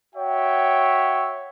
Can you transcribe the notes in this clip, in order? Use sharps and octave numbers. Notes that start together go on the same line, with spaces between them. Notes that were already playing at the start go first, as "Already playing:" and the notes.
F#4 C#5 E5 G5